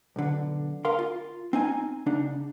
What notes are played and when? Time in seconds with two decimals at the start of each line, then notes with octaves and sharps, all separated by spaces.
0.16 B1 D3
0.85 A#4 F5 C6
0.99 F4
1.53 C4 D#4 G#5
2.06 C#3 D4 D#4